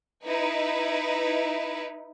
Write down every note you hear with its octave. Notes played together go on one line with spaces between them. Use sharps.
D#4 E4 B4